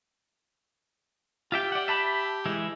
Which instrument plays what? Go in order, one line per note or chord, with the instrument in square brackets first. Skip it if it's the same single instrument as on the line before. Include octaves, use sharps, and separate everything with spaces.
[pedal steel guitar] F4 E5 G5 [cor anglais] G4
[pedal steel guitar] D5 F#5
E5 A5 B5
E3 G#3 E4